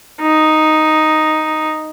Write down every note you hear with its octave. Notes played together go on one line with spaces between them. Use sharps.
D#4